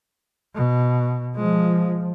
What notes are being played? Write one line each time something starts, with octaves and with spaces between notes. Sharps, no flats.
B2
F3 G#3